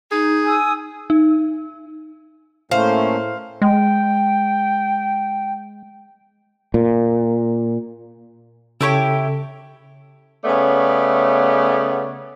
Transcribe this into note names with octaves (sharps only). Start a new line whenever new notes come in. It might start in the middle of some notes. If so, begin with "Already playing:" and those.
D#4 G#4
G#5 D#6 E6
D#4
A2 A3 A#3 C#4 C5 F5
G#3 G5
A#2
C#3 E4 G4 A4 C#5
C#3 A3 B3 C#5 D5